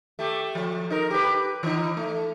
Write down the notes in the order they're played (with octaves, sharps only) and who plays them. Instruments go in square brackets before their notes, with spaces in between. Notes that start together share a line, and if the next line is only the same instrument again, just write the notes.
[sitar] A3 G4
F3
D#4 A#4
G4 B4
E3 D#4
A3